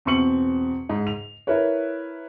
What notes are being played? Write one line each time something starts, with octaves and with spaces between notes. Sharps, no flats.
E2 B2 C4 C#6 C#7 F#7
G#2 D#4
F7
E4 A#4 B4 C#5